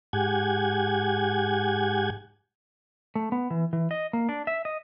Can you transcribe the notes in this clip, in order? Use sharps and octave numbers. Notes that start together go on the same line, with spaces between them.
G#2 G4 F#5 G#5 G#6
A3
B3
E3
E3
D#5
A#3
D4
E5
D#5